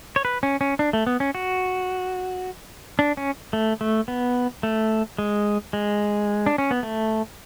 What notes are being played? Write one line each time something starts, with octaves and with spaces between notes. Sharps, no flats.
C#5
B4
C#4
C#4
D4
A3
B3
C#4
F#4
D4
C#4
A3
A3
B3
A3
G#3
G#3
D4
C#4
B3
A3